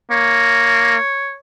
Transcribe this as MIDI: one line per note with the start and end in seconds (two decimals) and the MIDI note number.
0.11 0.97 58
0.11 1.36 73